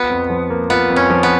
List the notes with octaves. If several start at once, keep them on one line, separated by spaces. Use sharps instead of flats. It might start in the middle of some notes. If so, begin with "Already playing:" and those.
Already playing: B3 F4
F2
F3
A#3
B3 F4
F2
C#4
F3
B3